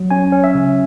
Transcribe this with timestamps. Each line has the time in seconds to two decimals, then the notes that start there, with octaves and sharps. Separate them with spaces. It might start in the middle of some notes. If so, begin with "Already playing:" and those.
Already playing: F#3
0.11 C#4 G#5
0.32 C#4
0.44 E5
0.55 C#3